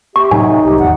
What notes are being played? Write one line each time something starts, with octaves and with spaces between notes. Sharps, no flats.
G4 E5 C#6
A2 C3 F#3 D#4 G#5
C2 G4
G#1 E2 F#5